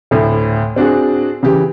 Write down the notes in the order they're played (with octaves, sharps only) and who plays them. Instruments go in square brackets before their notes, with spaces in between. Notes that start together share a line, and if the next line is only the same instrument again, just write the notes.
[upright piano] D2 A2
C4 D4 F#4 G#4
C#3 E3 G4